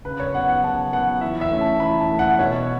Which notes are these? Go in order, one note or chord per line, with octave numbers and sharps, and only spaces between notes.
C#3 B4
C#5
F#3 B3 F#5
F#5
C#3 A5
F#3 B3 F#5
E3 E5
E5
A3 C#4
A5
E3 B5
A5
A3 C#4
F#5
B2 C#5